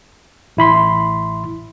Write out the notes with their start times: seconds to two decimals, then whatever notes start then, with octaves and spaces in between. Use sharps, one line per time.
0.57 A1 E4 B5 C6